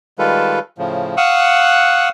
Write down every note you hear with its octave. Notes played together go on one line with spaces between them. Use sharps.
D#3 G3 G#3 F4 A4 B4
A2 C#3 F3
F5 F#5 C#6 D#6 E6 F#6